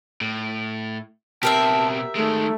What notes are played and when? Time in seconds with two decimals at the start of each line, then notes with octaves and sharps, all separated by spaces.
0.21 A2
1.43 B2 C4 G4 A#4 E5 A5
2.15 D#3 G#3 A3